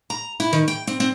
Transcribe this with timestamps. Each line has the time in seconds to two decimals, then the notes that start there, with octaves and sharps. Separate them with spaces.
0.10 A#5
0.40 E4
0.53 D#3
0.68 G5
0.87 C4
1.00 C4